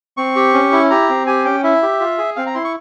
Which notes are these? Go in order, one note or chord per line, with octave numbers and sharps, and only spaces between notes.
C4 C#6
G4
C#4
E4
G4 A#5
C4
G4 G#5
C#4 G5
E4 E5
G4
F4
G#4
C4 F5
A#5
E4 C6
C#6